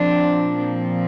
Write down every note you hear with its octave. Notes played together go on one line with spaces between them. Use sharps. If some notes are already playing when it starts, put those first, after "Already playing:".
Already playing: A#2 F3 C4 D4
C4